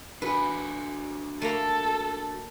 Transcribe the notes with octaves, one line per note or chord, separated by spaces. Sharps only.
D4 F#4 B4 G#5
A3 A#3 A4 A#5